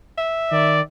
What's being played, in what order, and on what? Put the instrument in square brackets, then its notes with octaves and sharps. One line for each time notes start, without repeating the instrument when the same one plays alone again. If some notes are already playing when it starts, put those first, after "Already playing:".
[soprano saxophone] E5
[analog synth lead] D#3 [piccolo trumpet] D5